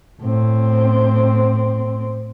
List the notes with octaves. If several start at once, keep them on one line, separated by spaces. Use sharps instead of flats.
A2 C4